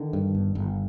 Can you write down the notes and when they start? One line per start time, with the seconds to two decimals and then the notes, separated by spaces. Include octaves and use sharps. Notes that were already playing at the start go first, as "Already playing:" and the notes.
Already playing: D3 D#3
0.13 G2
0.35 G1
0.55 G1